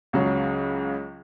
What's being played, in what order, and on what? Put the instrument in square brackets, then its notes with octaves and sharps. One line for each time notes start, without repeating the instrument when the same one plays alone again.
[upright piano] C#2 C#3 F#3